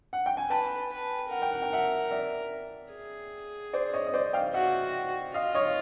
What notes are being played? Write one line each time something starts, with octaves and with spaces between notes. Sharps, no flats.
F#5
G5
G#5
B4 G5 A5
B4
A#4 F#5
G5
F#5
G5
E5 F#5
D5 E5
G#4
C5 D5
C#5 D#5
D#5
C5 D5
F5 G5
F#4 E5 F#5
F4 D#5 F5
C#5 D#5